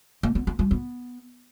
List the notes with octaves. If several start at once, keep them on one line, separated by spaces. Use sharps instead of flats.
A#3
B3
A#3
G3
B3